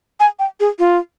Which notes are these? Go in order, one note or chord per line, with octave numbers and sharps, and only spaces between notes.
G#5
G5
G#4
F4